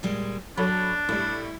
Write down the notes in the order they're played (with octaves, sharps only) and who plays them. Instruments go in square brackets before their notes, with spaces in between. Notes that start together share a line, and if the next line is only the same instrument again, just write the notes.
[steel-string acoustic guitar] A#2 G3 G#3
[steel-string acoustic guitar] F#3 [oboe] D4 [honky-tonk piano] A4 C#5 B5
[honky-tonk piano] A2 G3 [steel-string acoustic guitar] E4